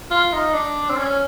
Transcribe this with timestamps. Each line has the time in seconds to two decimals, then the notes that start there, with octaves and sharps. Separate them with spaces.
0.11 F4
0.32 D#4
0.53 D4
0.90 C4
0.97 C#4